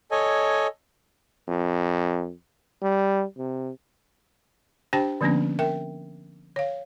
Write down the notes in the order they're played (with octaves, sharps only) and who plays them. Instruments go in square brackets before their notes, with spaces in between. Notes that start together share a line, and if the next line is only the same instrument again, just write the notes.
[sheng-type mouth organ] A4 C#5 D#5 G#5
[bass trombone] F2
G3
C3
[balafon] D4 G4 C5 G5 A5
D3 F3 A#3 B3 C#4 D4
A#4 E5 G5
C#5 F5